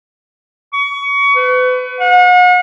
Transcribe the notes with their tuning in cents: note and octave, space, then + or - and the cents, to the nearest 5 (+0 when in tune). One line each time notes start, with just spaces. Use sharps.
C#6 +25
B4 +35
F#5 -40